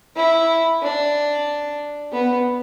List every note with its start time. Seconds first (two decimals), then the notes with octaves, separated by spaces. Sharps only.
0.16 E4
0.82 D4
2.12 B3